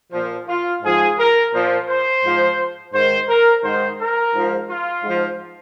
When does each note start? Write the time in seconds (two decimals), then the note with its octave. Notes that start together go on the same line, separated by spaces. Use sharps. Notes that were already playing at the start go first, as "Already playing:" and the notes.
0.13 A#2 F3
0.48 F4
0.83 G#2 F3 G#4
1.19 A#4
1.54 A#2 F3
1.88 C5
2.24 G#2 F3
2.94 G#2 D#3 C5
3.29 A#4
3.64 G#2 D#3 C5
4.00 A#4
4.35 G#2 F3
4.69 F4
5.04 G#2 F3